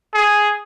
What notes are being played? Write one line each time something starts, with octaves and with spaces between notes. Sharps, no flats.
G#4